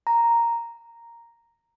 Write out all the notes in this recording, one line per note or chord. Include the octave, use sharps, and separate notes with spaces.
A#5